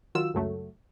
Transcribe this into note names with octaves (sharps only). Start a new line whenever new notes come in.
D#3 F#3 F4 E6
C#2 F#2 F#3 A3